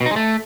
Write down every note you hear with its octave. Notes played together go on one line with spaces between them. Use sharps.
B2
D#4
G#3
A3